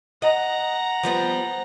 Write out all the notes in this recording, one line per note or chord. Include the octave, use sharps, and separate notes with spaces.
D#5 F#5 A#5
F3 G3 B3